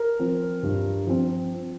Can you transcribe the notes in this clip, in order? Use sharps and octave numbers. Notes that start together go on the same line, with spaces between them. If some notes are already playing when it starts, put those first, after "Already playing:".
Already playing: A#4
F3 C4
G2
F3 C4